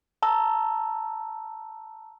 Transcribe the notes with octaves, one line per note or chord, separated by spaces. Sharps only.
A5 A#5 E6